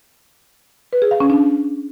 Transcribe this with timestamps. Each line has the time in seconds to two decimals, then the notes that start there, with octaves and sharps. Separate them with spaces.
0.93 B4
1.02 G#4
1.11 F5
1.20 C#4
1.30 D4